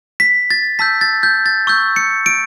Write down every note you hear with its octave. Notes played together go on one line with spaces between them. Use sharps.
B6
A6
A5 E6 G6 B6
A6
G6
A6
C#6 E6 G6
C#7
D7